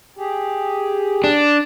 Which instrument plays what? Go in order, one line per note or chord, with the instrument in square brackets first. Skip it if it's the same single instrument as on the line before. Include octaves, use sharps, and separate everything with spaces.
[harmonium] G4 G#4
[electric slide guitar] D4